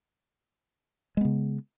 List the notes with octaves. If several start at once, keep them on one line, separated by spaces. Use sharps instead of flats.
C#3 G#3 B3